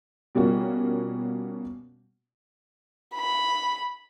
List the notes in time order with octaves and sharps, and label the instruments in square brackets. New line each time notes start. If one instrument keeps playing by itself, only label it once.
[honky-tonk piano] B2 G3 A#3 C#4 F4 F#4
[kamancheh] B5